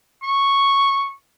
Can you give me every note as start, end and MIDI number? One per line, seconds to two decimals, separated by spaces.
0.23 1.11 85